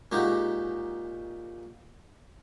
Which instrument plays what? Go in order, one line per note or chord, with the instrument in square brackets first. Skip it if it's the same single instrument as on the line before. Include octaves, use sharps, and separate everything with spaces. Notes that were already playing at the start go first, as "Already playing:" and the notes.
[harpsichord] A#2 G#3 D#4 F#4 G4